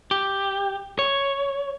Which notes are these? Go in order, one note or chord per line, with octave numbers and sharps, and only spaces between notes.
G4
C#5